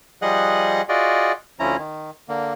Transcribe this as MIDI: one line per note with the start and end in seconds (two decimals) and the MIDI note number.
0.22 0.82 53
0.22 0.82 55
0.22 0.82 68
0.22 0.82 75
0.22 0.82 78
0.22 0.82 90
0.89 1.32 65
0.89 1.32 66
0.89 1.32 68
0.89 1.32 74
0.89 1.32 75
1.60 1.77 38
1.60 1.77 53
1.60 1.77 61
1.60 1.77 64
1.60 1.77 82
1.78 2.11 51
2.28 2.53 50
2.28 2.53 58